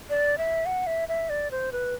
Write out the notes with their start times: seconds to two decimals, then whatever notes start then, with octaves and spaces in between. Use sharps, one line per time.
0.10 D5
0.38 E5
0.66 F#5
0.87 E5
1.09 E5
1.30 D5
1.51 C5
1.72 B4